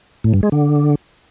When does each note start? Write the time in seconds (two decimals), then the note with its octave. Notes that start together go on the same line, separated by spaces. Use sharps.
0.24 A2
0.34 G2
0.43 G#3
0.52 D3